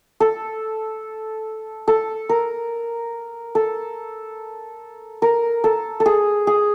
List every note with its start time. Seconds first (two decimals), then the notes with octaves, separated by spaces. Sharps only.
0.20 A4
1.88 A4
2.29 A#4
3.55 A4
5.22 A#4
5.64 A4
6.00 A4
6.06 G#4
6.47 G#4